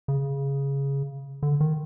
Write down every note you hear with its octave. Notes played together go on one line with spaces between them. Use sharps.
C#3
D3
D#3